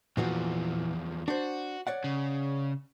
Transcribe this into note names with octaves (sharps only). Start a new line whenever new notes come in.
E2 A#2 E3 F3 F#4
D4 F#4 C5
C#5 D5 F#5
C#3